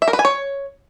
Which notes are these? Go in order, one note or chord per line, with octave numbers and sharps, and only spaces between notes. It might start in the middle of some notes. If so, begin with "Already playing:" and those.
E5
A#4
B4
G#5
C#5